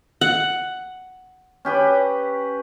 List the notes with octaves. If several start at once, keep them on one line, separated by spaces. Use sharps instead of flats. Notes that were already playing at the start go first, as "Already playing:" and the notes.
F#5
C#4 G4 B4